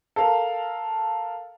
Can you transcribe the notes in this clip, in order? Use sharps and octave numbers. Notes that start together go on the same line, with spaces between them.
A4 A#4 F5